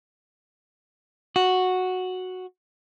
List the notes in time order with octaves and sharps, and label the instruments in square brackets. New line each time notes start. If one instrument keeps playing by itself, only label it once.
[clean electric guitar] F#4